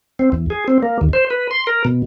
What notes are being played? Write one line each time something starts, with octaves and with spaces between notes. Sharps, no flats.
C4
E2
G#4
C4
A#3
D#2
C5
B4
C6
A#4
B2